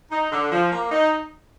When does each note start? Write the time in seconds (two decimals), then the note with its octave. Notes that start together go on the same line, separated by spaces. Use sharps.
0.11 D#4
0.32 D3
0.52 F3
0.72 A#3
0.92 D#4